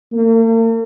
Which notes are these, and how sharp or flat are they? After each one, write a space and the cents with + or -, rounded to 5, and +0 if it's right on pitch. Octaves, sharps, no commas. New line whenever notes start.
A#3 -45